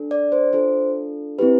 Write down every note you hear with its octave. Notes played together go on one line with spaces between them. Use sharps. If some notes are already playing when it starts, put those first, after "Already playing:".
Already playing: D4 A4
D5
C5
D4 F4 A4 C5
C4 E4 G4 B4